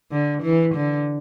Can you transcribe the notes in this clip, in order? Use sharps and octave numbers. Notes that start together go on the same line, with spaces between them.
D3
E3
D3